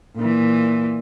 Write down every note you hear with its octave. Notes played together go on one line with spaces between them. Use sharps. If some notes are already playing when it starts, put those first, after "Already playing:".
A#2 E3